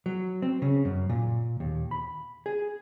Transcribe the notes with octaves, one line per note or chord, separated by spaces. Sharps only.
F#3
C4
C#3
F#2
A#2
D#2
B5
G#4